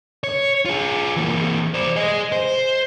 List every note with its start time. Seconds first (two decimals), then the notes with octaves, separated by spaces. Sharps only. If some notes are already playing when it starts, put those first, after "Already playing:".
0.24 C#5
0.65 F4 G#4
1.16 E3 A#3
1.74 C5 D5
1.96 G#4 D#5
2.32 C5